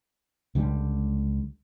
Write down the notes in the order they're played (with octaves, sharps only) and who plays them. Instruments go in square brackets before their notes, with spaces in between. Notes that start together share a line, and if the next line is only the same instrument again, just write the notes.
[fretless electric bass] C#2 D3 G3